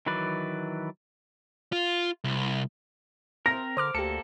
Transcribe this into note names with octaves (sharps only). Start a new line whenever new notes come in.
D#3 E3 F#3 B4 D5
F4
C2
C4 A#4 A#6
D3 C5 D6 F6
D2 A#3 G4 A4 C#7